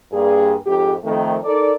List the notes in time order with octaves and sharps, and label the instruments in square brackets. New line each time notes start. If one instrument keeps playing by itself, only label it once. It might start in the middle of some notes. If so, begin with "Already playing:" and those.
[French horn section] G2 A#3 G#4
F2 G#2 G4
F2 D#3 A3
D#4 A4 A#4 D5